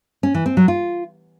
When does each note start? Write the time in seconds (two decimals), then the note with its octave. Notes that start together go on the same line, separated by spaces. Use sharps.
0.23 C#4
0.34 E3
0.46 C4
0.57 F#3
0.68 F4